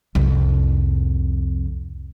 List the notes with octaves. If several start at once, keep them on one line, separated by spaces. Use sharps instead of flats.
C2 F2